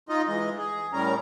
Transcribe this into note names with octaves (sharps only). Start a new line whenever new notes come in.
D#4 F4 D#5
E3 G#3 D#5
G#4
A2 G3 C#4 A#4 A#5